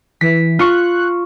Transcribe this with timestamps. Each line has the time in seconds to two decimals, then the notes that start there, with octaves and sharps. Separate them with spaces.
0.21 E3 B6
0.59 F4 C#6 F#6